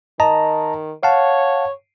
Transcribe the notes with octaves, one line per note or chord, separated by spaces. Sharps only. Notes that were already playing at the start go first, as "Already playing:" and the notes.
D#3 D#5 A5 A#5
C#5 F5 F#5 A5